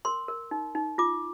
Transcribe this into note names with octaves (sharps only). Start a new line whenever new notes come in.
A#4 C6
A#4
D#4
D#4
F4 D6